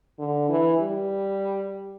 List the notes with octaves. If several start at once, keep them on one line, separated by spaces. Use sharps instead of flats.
D3
E3
G3